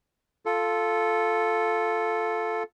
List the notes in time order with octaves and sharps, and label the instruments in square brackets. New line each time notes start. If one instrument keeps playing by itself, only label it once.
[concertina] F4 A4